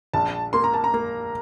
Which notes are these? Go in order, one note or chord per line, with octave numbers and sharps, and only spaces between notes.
A#1 A5
A#3 C6
A#5
A5
A#5
A#3